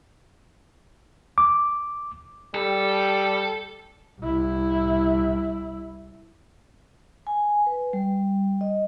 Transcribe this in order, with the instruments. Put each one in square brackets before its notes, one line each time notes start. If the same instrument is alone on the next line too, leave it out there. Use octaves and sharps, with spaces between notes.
[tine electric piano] D6
[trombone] G3 [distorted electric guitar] A4
[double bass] C2 E4
[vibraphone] G#5
B4
G3
D#5